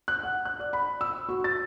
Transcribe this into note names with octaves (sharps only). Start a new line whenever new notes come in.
F#6
F#5
F#6
D5
B5
E6
F#4
A6